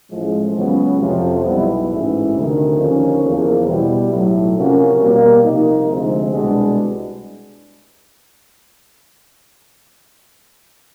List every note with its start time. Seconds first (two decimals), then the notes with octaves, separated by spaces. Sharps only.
0.11 A1 A2 F3 G#3
0.55 C#2 C#3 F#3 B3
1.00 F2 C3 F3
1.44 B1 B2 G3 B3 E4
1.88 A1 G#2 E3
2.33 D2 C3 D#3
2.77 D#2 D3 F3 A#3 C#4
3.21 E2 C#3 F3 A#3
3.66 B2 G3 B3 E4 G4
4.10 B1 A2 F#3
4.55 C3 F3 A#3 C#4 F#4
4.99 B2 G3 A#3
5.43 C3 F3 A#3 D#4
5.88 D2 C3 F3 G#3 C4
6.32 C2 B2 G#3 B3 D4